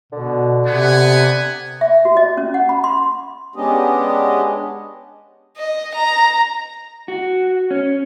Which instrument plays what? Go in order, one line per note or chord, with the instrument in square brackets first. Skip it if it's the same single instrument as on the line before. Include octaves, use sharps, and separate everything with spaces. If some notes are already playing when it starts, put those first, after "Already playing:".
[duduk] B2 [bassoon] D3
[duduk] C3 [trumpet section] B3 F#5 G#5
[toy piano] E5
F#4
D#5
C#4
F#5
B5
C6
[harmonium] G#3 B3 C#4 D4 G4 D#5
[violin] D#5
A#5
[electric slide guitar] F#4
C#4